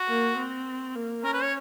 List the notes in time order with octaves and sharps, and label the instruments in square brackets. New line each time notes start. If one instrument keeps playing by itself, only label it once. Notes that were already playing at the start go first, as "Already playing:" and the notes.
Already playing: [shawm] F#4
[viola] A#3
C4
A#3
[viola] C#4 [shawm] A#4
[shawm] B4
C#5